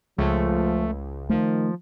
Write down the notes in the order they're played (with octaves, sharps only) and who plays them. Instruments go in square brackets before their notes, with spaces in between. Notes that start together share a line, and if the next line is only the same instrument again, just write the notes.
[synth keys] C#2 [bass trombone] F3 [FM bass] A3
[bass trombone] D#3 [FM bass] F3 [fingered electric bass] A3